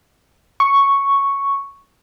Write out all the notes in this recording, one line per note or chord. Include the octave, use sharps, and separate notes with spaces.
C#6